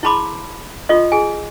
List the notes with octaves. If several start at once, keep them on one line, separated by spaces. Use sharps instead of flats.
E4 G#4 A5 B5 C6 D6
F4 A4 D#5 C6
G#4 G#5